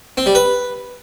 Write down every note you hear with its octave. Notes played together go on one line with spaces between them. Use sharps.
C4
G3
B4